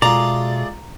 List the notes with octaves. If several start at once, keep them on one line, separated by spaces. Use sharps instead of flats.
B2 G#3 A3 F4 D5 A#5